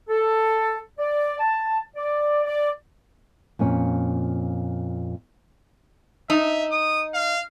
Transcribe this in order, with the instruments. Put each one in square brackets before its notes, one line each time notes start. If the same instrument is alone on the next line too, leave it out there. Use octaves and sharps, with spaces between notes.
[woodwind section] A4
D5
A5
D5
D5
[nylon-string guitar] F2 A#2 C#4
[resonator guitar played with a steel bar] D#4 [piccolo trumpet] E5
[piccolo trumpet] D#6
F5